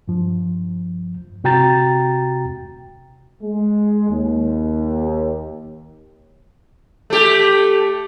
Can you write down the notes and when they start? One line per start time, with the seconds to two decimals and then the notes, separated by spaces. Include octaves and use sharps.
0.08 G2 F3
1.44 C3 F#4 G5 A#5 A6
3.43 G#3
4.10 D#2
7.10 A3 G4